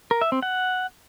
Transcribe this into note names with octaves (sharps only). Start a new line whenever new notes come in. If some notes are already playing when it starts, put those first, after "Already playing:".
A#4
E5
C4
F#5